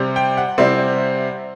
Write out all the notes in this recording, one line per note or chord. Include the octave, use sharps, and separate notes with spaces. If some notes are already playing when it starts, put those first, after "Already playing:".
Already playing: C3 G3 C4
G5
F#5
C3 G3 C4 E4